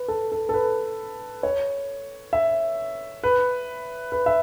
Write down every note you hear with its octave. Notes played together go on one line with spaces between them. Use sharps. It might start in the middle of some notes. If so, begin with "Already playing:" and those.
Already playing: B4
A4
A4
A4
B4
C#5
E5
B4
B4
E5